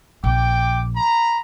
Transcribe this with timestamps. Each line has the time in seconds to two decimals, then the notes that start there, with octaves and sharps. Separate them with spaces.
0.24 A#1 G5 D6
0.96 A#5 B5